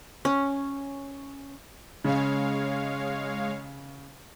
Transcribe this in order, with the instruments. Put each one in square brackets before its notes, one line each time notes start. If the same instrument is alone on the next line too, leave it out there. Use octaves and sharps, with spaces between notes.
[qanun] C#4
[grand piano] C#3 [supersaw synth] G#3 C#5 F5